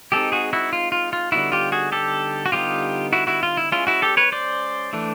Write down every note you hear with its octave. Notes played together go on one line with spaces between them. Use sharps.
G#3 C4 D#4 G4 A4
F#4 G#4
E4 F#4
F4
F4
F4
D3 G3 B3 D#4 E4 F#4
F4 G4
F#4 G#4
G4 A4
F#4
D3 G3 B3 D#4 F4 G4
E4 F#4
E4 F#4
F4
E4
G#3 C#4 E4 F4
E4 F#4
G4 A4
B4 C#5
C5 D5
E3 A3 D4